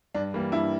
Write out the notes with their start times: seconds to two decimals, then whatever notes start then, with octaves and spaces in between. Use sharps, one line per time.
0.15 G2 D4
0.34 E3 G3 A#3
0.52 G2 E4